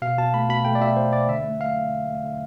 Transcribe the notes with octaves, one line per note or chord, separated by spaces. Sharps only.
B2 F5
B2 A5
A3 B5
B2 B5
A3 G5
D5
B2 E5
B2 C5
A3 D5
D3 E5
A3
A3 F5
D3
D3
A3
D3